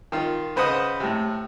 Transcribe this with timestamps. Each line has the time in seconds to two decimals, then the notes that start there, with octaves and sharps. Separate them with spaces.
0.12 D#3 F4
0.56 C#3 B4 C5 D#5 F#5 D#6
1.00 A2 C3